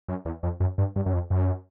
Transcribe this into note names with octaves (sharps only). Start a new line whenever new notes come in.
F#2
E2
F2
F#2
G2
G2
F#2
F2
F#2